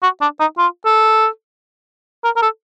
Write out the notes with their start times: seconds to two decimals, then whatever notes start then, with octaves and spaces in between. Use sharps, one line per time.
0.03 F#4
0.21 D4
0.40 D#4
0.58 F4
0.85 A4
2.24 A#4
2.36 A#4
2.42 A4